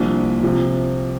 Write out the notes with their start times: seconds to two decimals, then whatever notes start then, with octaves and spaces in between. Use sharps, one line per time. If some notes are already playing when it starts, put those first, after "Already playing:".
Already playing: C2 A#2 F3 A#3 D4
0.43 C3 F3